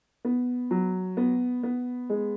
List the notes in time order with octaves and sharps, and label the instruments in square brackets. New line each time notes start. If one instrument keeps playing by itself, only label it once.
[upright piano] B3
F#3
B3
B3
G#3